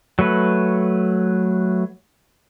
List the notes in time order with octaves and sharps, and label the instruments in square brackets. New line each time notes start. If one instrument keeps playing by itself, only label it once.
[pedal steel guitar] F#3 A3 B4